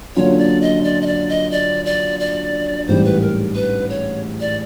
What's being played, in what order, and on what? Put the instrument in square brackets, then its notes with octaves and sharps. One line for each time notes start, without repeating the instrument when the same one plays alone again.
[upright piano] D3 F#3 A#3 C#4 F4 [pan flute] C#5
[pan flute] D5
D#5
D5
D#5
D5
D#5
D5
D5
D5
[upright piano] A1 G#2 E3 G3 [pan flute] C5
[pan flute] B4
A#4
B4
C#5
D5